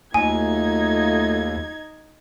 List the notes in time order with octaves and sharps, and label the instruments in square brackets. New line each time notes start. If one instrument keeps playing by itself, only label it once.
[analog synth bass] D#2 [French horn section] F#3 A3 F4 [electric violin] D#4 G#6 [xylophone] G#5